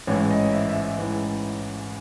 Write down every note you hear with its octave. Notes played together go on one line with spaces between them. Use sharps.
A1 G#2 E3 C#5
D#5
E5
E5
D#5
A1 G#2 E3